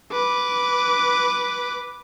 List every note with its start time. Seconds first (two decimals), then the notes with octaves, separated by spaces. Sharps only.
0.12 B4 D6